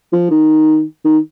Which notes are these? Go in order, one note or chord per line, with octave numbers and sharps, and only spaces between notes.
F3
D#3
D#3